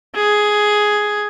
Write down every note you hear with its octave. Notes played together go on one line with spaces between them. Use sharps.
G#4